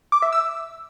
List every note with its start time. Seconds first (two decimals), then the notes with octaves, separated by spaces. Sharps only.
0.12 D6
0.22 E5
0.33 E6